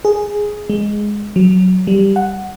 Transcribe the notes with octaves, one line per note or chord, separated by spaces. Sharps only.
G#4
G#3
F#3
G3
F#5